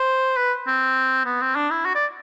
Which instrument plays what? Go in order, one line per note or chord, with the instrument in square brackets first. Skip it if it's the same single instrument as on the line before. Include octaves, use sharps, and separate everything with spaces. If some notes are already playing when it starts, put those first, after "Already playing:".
Already playing: [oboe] C5
B4
C4
B3
C4
D4
E4
F#4
D5